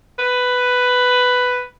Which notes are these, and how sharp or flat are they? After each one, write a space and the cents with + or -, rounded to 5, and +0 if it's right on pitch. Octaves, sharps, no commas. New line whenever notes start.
B4 +10